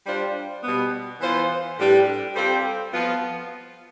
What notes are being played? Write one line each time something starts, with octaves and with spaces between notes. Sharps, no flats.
G3 D4 F4 C5
B2 G3 B3
E3 B3 F4 C5
A2 G3 D4 G4 B4
G3 C4 F4 A4 C5
F3 B3 F4